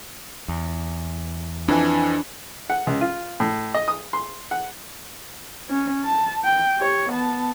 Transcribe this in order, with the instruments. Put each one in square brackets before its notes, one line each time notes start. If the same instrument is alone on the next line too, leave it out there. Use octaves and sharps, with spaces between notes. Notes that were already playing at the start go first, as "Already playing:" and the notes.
[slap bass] E2
[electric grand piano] F2 E3 G#5 [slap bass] D4
[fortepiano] F#5
C#2
F4
A2
D#5
D#6
C6
F#5
[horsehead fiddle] C#4
A5
G5
G4 C#5
B3 A5